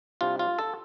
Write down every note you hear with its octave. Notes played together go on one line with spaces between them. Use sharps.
C2 C3 G3 D4 F4
F4
A4